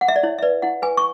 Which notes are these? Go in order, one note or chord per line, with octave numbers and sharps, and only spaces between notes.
F#5
E5
D5
E4 C#5
E5
B4 D5
E4 F#5
B4 G#5
C#6